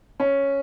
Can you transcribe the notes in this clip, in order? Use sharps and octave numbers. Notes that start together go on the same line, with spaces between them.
C#4